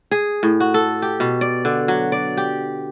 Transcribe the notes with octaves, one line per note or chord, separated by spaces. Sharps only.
G#4
A2
F#4
A4
G4
B2
D5
D3
F#3
D5
G4